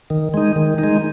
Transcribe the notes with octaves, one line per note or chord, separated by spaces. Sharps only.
D#3
G#3 D#4
D#3
D#4
G#3